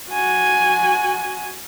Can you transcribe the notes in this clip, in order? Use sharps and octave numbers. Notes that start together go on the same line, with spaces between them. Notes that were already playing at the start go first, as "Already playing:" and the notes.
F#4 G#5